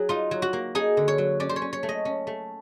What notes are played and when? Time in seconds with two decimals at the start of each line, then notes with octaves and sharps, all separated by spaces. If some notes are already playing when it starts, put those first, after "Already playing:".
Already playing: F#3 G#4
0.09 D#4 F4
0.31 F#3
0.42 F#4
0.53 A#3
0.75 D#4 G#4
0.97 D3
1.08 C#5
1.18 F#3
1.40 C#4 D5
1.49 C5
1.56 C#5
1.62 C#4
1.73 C#5
1.83 A3
1.89 D#5
2.05 C#4
2.27 A3